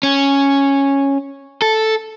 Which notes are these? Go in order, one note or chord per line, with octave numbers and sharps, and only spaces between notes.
C#4
A4